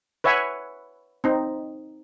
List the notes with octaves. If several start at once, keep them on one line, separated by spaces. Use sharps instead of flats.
B4 C#5 E5 F#5 G#5
C4 D#4